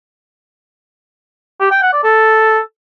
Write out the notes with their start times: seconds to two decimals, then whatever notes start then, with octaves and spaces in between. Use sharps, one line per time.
1.60 G4
1.71 G5
1.82 F#5
1.93 D5
2.04 A4